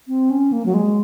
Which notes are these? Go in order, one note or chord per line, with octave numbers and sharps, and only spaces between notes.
C4
C#4
A#3
F#3
G#3